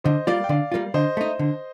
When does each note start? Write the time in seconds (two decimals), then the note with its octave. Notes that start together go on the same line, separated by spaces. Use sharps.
0.04 D3 C5 D#5
0.27 G3 A#3 F4 D5 F5
0.44 G5
0.49 D3 D5 F5
0.72 G3 A#3 F4
0.94 D3 C5 D#5
1.17 A3 D#4
1.39 D3